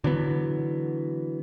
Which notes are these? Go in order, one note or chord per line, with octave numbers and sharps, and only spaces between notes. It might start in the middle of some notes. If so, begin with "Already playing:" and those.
D3 E3 F#3 B3